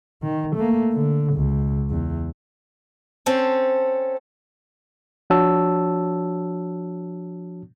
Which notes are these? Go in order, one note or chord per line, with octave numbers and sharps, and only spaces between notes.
D#3
A3 A#3
D3
C#2
E2
C4 C#4 A4 C5
F3 D4 F#4 C#5 A5 E6